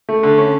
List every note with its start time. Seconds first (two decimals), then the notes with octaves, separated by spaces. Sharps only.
0.09 A3
0.23 D3
0.38 C#4